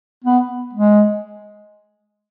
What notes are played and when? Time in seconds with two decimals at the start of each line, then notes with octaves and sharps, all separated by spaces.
0.24 B3
0.73 G#3